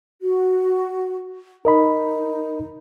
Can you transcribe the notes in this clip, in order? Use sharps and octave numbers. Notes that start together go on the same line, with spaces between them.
F#4
D#4 A#4 D#5 B5